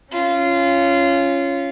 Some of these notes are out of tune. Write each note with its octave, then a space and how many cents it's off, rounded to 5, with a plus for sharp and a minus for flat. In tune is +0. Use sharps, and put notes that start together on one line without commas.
C#4 +0 F4 -20